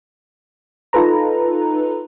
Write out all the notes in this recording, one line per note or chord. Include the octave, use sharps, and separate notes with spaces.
D#4 F4 A4 B4 A#5